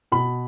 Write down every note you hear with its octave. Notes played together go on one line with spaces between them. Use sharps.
B2 B5